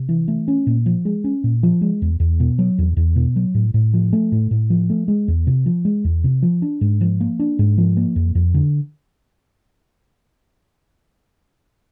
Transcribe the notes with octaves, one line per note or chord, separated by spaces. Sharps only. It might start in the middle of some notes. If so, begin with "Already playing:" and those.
Already playing: C3
E3
A3
C#4
A#2
F3
G#3
C#4
A#2
F3
G#3
E2
E2
B2
F#3
E2
E2
B2
F#3
A2
A2
F3
A3
A2
A2
F3
A3
G#3
E2
C3
F3
G#3
E2
C3
F3
D4
G#2
F3
A#3
D4
G#2
F3
A#3
F2
F2
D3